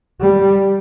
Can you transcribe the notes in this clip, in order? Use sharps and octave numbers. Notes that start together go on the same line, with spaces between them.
G3